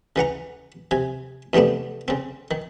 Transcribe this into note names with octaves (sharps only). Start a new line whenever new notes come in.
C#3 E3 F#5 A#5
C3 G#5
E2 C3 A3 B3 D4
C#3 C4
D#3